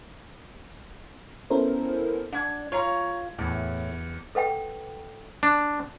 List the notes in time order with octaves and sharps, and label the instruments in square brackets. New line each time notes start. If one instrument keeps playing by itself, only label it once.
[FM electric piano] B3 C#4 E4 A4 A#4 C5
[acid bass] D4 [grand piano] F#5 G#6
[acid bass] F4 [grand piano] C#5 A#5 C#6
[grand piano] E2 [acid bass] A2
[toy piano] A4 B4 F#5 G5
[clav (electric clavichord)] D4